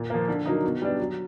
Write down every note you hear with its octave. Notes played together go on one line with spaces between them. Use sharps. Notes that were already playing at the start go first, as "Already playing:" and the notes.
Already playing: A#2
F3 A#3
D3
F#3 A#3 D#4
B2
G3 B3 D4
F#3